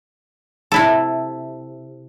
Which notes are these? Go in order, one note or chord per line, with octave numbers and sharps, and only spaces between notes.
C3 E4 A4